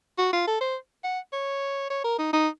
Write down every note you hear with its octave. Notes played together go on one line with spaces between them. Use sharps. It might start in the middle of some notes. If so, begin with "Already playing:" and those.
F#4
F4
A4
C5
F#5
C#5
C#5
A#4
D#4
D#4